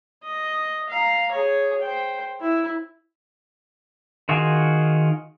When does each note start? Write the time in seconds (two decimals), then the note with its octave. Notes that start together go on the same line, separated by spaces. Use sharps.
0.23 D#5
0.89 F5 A#5
1.31 G#4 C#5
1.81 C5 G5
2.40 E4
4.29 D#3 F4 F#4 G#4